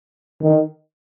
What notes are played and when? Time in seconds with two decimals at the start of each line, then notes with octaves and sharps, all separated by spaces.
0.42 D#3